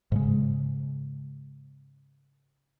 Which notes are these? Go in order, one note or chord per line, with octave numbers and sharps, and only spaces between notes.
G#2 C#3 G#3